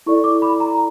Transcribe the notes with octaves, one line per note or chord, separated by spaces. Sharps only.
E4 A4 D5 C#6
D6
B5
A#5